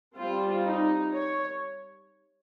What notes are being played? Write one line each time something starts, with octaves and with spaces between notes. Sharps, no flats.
G3 C4 F4
D#4
C#5